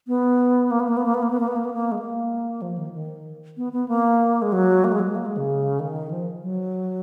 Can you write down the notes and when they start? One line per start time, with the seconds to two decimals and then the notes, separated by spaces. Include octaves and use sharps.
0.08 B3
0.71 A#3
0.80 B3
0.88 A#3
0.97 B3
1.06 A#3
1.14 B3
1.23 A#3
1.31 B3
1.40 A#3
1.48 B3
1.56 A#3
1.65 B3
1.73 A#3
1.92 G#3
1.99 A#3
2.62 F3
2.78 D#3
2.93 D#3
3.57 B3
3.73 B3
3.88 A#3
4.42 G#3
4.52 F#3
4.84 A#3
4.92 G#3
5.00 F#3
5.08 G#3
5.15 A#3
5.26 G#3
5.37 C#3
5.80 D#3
6.10 F3
6.42 F#3